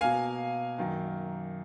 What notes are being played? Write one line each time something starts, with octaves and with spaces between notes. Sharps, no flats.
B2 A#3 F5 G#5
F#2 D#3 A#3